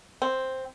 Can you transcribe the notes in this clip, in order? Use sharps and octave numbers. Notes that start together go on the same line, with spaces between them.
C4